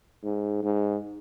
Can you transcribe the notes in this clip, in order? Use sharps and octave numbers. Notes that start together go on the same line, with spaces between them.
G#2
G#2